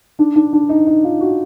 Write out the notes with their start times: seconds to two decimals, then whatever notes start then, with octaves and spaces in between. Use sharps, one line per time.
0.19 D4
0.36 D4
0.53 D4
0.69 D#4
0.87 D#4
1.04 F4
1.21 F#4